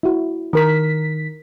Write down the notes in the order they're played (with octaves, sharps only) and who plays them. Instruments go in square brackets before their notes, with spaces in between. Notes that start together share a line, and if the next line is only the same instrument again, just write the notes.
[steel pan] E4 F#4
[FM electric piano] D#3 B6 [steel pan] A#4 A#5